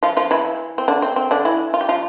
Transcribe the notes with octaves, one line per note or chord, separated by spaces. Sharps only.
F3 F4
F3 F4
E3 E4
C4
D3 D4
C4
C4
D3 D4
E3 E4
F4
G4
F3 F4